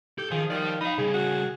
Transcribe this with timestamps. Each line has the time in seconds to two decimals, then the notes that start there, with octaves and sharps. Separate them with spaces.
0.18 G4 A4 G6
0.31 D#3 F3 G#4
0.50 D#3 G4 D5
0.81 D#4 D#5 F5 B5
0.98 C#3 G3 G#4
1.14 F#4